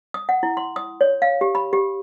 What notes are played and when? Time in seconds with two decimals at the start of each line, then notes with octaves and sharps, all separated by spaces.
0.14 D#6
0.29 F#5
0.43 E4
0.57 C6
0.76 D#6
1.01 C#5
1.22 F5
1.41 G4
1.55 B5
1.73 G4